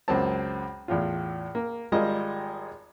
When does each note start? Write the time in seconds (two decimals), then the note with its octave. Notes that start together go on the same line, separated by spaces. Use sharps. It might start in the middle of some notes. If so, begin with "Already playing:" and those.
0.08 C#2 F#2 A#3 C4 A5
0.88 E2 A2 F4
1.55 A#3
1.92 G#1 G3 G#3 F4 A#4 D#5